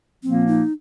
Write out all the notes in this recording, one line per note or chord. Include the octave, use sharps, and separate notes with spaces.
A#2 F3 A#3 C4
D#4